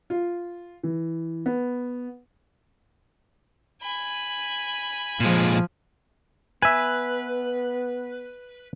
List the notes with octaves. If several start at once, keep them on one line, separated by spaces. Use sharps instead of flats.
F4
E3
B3
G#5 B5
A#2 F3 G#3
B3 B4 E5 G#5